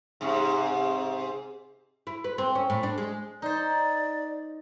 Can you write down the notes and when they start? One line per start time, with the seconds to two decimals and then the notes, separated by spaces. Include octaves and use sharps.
0.21 G#2 C3
2.07 E4
2.24 B4
2.38 C4
2.55 C#4
2.70 A2
2.83 D4
2.98 G#3
3.42 D#4 C5 D5